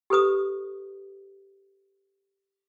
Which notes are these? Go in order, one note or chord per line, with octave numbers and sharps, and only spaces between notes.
G4 A4 B4 D#6